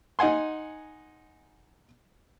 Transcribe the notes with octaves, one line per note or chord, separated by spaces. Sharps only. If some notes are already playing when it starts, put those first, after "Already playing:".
D#4 D#5 F#5 G#5 C6